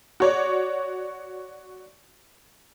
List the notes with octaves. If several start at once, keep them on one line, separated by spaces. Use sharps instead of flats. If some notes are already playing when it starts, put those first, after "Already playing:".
F#4 C#5 D5